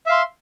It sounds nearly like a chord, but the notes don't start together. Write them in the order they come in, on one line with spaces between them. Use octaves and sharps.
E5 F5 C6